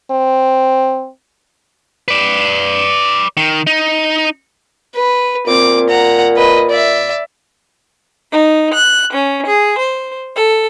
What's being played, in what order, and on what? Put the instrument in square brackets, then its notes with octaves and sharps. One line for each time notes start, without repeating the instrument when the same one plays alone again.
[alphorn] C4
[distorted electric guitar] B4 D5
D#3
D#4
[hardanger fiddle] B4
[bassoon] A#2 [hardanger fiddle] C4 D6
[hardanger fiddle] F#5 A#5
B4 D#5
D5 E5
[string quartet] D#4
F#6
C#4
G#4
C5
A4